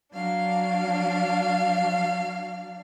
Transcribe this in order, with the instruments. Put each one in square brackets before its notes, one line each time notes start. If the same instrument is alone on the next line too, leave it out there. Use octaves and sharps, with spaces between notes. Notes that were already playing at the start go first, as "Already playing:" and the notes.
[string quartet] F#3 D4 F5